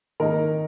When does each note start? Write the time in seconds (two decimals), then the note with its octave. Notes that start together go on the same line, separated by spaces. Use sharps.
0.20 D#3 A#3 D#4 A#4